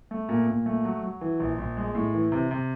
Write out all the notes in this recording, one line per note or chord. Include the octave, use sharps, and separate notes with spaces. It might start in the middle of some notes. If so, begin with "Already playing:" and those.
A3
A#2
A#2
A3
F#3
F#3
E3
A#1
A#1
G#3
A2
E3
C3
C3